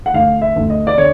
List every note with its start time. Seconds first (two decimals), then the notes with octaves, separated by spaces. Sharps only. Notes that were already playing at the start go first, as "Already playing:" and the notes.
0.06 F#5
0.14 D2 F5
0.42 E5
0.56 D2
0.70 D#5
0.87 D5
0.98 D3 C#5